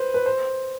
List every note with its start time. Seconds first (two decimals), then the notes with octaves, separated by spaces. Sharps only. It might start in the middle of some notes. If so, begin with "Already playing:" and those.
Already playing: B4 C5
0.14 B4
0.26 C5